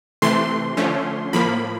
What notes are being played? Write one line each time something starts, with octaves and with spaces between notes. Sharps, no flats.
C3 E3 A3 C6
D3 F3 A3 C#4
A2 F3 A#3 B5